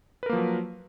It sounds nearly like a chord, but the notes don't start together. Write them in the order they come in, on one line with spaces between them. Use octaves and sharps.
B4 A#4 A#3 F3 F#3